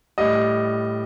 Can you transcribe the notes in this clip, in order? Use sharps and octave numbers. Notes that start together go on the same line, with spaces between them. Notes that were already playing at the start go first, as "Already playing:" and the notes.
A2 G3 D#5